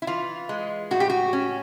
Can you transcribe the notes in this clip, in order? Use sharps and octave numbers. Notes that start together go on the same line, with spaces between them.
E4
E3 F4
G#3
A2 F#4
G4
F#4
C#4